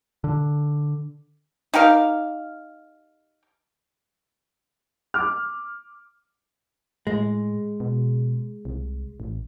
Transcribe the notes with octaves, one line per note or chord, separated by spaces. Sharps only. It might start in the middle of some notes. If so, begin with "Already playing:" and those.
D3
D#4 G4 A#4 F5
D6 F6
A2 G#3
B2
C2
A1